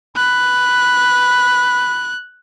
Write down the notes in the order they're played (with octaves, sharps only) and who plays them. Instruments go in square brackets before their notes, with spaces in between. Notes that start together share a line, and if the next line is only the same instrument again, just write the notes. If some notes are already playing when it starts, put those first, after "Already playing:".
[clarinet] B5 [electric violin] F#6